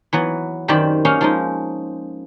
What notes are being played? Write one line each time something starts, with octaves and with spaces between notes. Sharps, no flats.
E3 F#3 B3
F#2 D#3 C4 G4 D5 B5
A#3 C#4 D#4 F5
F3 G#3 D#4